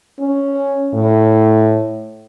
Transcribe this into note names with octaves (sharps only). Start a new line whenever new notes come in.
C#4
A2